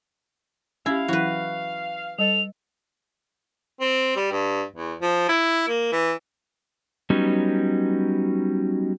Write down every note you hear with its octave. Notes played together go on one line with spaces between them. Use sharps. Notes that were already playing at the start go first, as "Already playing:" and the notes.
C#4 E4 G4 F5
E3 F#3 E4 F#4 B4
G3 A4 D#5 F7
C4
G3
G2
E2
F3
E4
A#3
E3
F#3 G3 B3 C#4 D#4